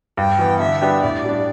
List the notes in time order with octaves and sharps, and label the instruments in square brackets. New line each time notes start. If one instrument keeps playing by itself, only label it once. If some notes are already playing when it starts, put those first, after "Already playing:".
[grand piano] G2 [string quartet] G5
[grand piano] E3 B3
[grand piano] D3 [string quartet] E5
[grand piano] G3 B3 D4 G4
[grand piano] A2 [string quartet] D5
[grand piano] G3 D4